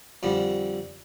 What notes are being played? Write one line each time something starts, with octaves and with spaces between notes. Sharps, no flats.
F2 D3 G3